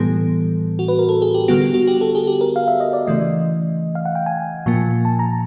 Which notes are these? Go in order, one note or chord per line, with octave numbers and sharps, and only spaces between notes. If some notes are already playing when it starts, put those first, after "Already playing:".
Already playing: A2 E3 G3 B3 A4
F#4
B4
A#4
A4
G#4
G4
D3 G3 B3 F#4
F#4
F#4
G4
A4
G#4
G4
A#4
F5
E5
D#5
D5
C#3 E3 A3 D#5
F5
F#5
G5
G#5
A#2 F3 A#3
A5
A#5